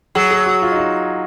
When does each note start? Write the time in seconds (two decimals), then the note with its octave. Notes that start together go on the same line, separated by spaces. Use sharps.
0.15 F#3 G#4
0.31 G#4
0.46 F#4
0.62 F4
0.72 D#4
0.78 F4